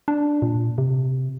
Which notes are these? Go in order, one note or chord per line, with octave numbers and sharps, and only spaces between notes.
D4
A#2
C3